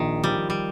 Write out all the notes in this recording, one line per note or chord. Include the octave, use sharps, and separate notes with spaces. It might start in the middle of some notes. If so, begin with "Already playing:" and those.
Already playing: A#1 D#3
F3 G3
G3